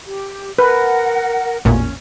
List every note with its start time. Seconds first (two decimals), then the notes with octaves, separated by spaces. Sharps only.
0.06 G4
0.59 A#4 B4 F#5
1.65 A1 E2 A#2 C#4